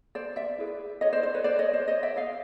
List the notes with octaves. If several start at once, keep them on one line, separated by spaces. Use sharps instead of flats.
C5 D5
D5 E5
E4 G#4 B4
C#5 D#5
C5 D5
C5
B4 C#5
C5 D5
C#5 D#5
C5 D5
C#5 D#5
D5 E5
D#5 F5